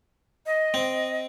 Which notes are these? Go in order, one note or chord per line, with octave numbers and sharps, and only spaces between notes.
D#5
C4